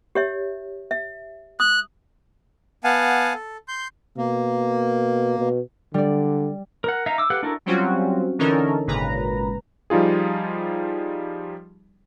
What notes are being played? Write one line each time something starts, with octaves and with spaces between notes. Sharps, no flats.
G4 C#5 E5
E5
D#6 F#6
B3 F5 F#5 G#5 A5
A4
C6 G6
B2 A#3
B2
D3 G3 D5
A#4 F#5
D#4 E5 F5 A#5
D6 E6
G4 A4 B4 F5 F#5
D4 E4 F#4 A4 A#4
F#3 G3 C4 C#4 F4 F#4
D3 E3 C#4 D#4 A4 A#4
G#1 A#2 C#3 B4 A#5
F3 G3 D#4 F4 G#4